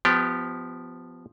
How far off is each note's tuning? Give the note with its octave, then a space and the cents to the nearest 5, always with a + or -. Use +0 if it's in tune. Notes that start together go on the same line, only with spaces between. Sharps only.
F3 +0 B3 +20 G4 +0